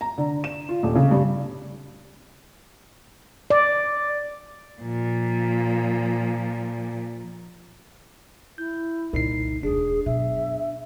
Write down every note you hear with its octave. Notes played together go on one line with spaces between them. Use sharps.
A#5
D3
E7
F4
D#1
C#3
G2
D5
A#2 F3
E4 G6
F#1 C2 A#2 D#4 C7
E1 D2 D4 G#4
F#2 B2 E5